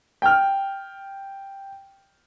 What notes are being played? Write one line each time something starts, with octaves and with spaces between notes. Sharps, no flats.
G5 F6